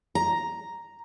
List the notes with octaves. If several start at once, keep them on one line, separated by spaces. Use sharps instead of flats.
A#5